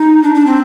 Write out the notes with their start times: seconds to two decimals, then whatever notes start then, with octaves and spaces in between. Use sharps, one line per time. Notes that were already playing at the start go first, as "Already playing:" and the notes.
Already playing: D#4
0.23 D4
0.35 D4
0.47 C4